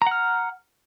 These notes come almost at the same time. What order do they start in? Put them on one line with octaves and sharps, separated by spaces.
A#5 F#5 F6